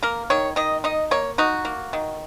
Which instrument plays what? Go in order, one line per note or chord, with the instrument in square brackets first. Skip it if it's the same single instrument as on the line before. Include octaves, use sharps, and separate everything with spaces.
[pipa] A#3 A#4
D#3 C#5
D#3 D#5
D#4 D#5
A#3 C#5
D#4 F#4
A#3
D#3